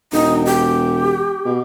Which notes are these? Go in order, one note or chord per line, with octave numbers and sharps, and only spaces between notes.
E1 D#4
G4
B2